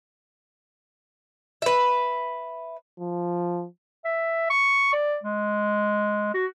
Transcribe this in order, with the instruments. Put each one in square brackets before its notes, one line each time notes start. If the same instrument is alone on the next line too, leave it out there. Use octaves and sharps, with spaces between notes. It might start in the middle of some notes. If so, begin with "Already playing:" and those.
[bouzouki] B4 E5
[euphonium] F3
[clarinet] E5
C#6
D5
G#3
F#4